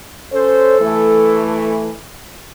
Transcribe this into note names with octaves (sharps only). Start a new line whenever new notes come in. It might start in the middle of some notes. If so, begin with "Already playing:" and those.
C#4 A4 C5
E3 A3